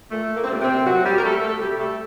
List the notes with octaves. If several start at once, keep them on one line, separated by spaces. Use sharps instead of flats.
A#2 A3
A#3
C4
A#2 G3 A#3
C3 C4
A#2 F#3 F#4
G3 G4
A#4
G3 A3 A4
A3 A4
C3 G3 G4
A3 A4